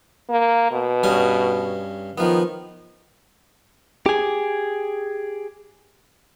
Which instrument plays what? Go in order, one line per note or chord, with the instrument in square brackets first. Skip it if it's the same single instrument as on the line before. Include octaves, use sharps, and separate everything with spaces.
[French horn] A#3
B2
[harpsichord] G2 C#4 D#6
[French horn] D#3 [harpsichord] F3 B3
[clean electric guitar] G4 G#4